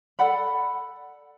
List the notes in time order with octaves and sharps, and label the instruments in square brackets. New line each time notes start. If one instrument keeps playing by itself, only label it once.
[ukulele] A4 D5 F#5 B5